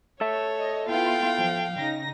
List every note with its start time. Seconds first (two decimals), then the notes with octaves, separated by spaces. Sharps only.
0.21 A4 C#5 E5
0.60 D#5
0.89 B3 E4 F4 F5 G5
1.37 F3
1.78 C#3 D#4 A#6